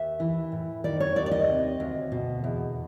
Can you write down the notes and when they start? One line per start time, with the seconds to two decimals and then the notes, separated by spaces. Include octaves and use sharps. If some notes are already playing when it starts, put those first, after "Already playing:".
Already playing: D#2 E5
0.20 E3
0.52 A2
0.84 D#3 D5
1.00 C#5
1.16 D#2 D5
1.26 D5
1.31 D#5
1.48 C3
1.80 D2
2.12 B2
2.44 E2